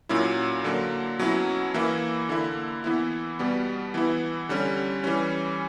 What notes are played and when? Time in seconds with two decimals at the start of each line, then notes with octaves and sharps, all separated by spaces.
0.09 A#2 F#3 C#4 E4
0.64 D3 F#3 A#3
1.19 B2 F#3 C#4 E4
1.74 E3 A#3 E4
2.29 D3 A#3 E4
2.84 E3 B3 E4
3.39 B2 G3 B3
3.94 E3 B3 E4
4.49 D3 G3 C#4
5.04 E3 G3 C#4